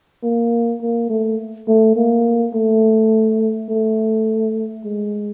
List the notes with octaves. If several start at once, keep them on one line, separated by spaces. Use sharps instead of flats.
A#3
A#3
A3
A3
A#3
A3
A3
G#3